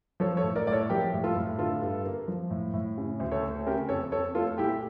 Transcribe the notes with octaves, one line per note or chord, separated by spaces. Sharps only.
F3 A4 C#5
A4 C#5
A2
A#4 D5
A2 A4 C#5 D5
F3 G4 A#4
A2
F4 A4
A2
D3 F4 A4
G2
A#3
F3
A2
A2
C#3
D2
A4 C#5
A3
C#3 G4 A#4
F2 A4 C#5
F2 A4 C#5
A3 F4 A4
A#2 E4 G4